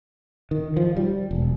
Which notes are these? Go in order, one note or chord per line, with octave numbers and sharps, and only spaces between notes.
D#3
F3
G3
E1